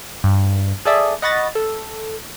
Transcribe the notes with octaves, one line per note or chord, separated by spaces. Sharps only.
G2
G#4 A4 D5 E5 D#6
D#5 F#5 B5 C#6 A6 A#6
A4